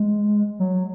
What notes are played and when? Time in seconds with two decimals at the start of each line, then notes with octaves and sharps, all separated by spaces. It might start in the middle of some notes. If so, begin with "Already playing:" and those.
Already playing: G#3
0.60 F#3